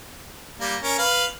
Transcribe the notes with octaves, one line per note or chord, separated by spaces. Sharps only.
G3 A#3
C#4 A#4
B4 F5